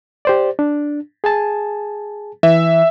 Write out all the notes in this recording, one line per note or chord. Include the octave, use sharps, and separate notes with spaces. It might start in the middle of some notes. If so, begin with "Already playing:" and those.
G4 C5 D5
D4
G#4 G#5 A5
E3 E5